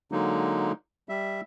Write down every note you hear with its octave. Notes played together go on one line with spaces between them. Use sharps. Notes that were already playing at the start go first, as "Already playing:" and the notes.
D3 F#3 G#3 A#3 D#4
G3 E5